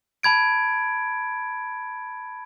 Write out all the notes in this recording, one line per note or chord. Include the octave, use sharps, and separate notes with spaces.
A5 B5 G#6 D7